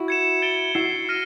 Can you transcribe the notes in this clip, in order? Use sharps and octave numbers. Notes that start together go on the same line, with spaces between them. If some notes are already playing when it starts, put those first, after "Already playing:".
Already playing: E4 F#4
G#6 C#7 E7
A6 D7 G7
E4 F#4 G#6 C7 E7
F6 A#6 D#7